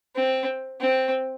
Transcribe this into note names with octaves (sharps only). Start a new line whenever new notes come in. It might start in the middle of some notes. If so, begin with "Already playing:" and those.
C4
C4